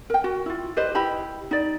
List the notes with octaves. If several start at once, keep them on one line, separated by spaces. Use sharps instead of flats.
A#4 G5
F#4
E4 F4
G4 B4 C5 D#5
E4 G4 D#5 B5
D#4 D5